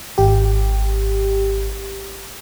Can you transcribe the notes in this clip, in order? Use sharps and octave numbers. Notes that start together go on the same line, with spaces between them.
G#1 G4